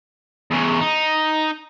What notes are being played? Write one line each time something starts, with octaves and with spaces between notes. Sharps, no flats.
E2 C#3
D#4